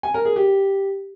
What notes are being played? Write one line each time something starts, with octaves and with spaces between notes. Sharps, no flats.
G#5
A#4
G#4
G4